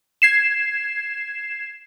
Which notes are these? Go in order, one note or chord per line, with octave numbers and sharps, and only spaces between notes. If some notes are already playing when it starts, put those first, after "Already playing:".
G#6 C7 E7